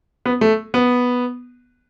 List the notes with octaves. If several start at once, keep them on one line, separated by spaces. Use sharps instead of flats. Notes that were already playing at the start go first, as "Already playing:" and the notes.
B3
A3
B3